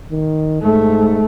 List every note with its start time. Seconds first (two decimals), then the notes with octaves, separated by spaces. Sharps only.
0.11 D#3
0.63 G#2 A3